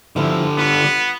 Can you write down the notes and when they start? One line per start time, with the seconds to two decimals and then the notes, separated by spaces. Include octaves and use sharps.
0.16 D3 F3 G3 E4
0.58 B3 F4